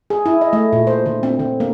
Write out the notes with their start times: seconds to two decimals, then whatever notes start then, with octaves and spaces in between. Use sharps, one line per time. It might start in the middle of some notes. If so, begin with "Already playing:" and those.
0.10 G#4
0.26 E4
0.41 D#5
0.53 A3
0.73 A#2
0.87 C5
1.06 D3
1.23 C4
1.39 D3
1.60 A#3